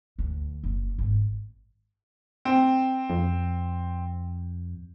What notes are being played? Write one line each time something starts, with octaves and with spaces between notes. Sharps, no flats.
D2
F#1
G#1
C4
F2